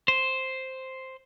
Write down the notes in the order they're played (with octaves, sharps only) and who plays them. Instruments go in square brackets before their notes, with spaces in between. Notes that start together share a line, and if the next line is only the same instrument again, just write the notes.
[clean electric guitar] C5